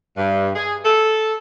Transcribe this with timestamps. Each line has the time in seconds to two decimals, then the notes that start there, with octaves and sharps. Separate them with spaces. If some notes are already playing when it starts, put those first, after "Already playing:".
0.17 G2
0.56 G#4
0.85 A4